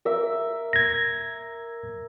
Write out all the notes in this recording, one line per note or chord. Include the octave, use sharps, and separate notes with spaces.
A#4 E5
G#6 A#6